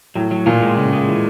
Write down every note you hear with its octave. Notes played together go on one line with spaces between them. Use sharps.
A2 F#3
F#3
A#2 F4
G#3
C#3
G#3
E3